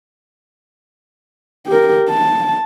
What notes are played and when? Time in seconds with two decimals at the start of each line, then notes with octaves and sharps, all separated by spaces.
1.67 G4 A#4
2.09 A5